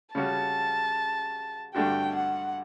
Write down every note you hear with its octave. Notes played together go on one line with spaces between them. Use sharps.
C#3 G3 C#4 F#4 A5
G2 D3 A3 D4 F#4 G5
F#5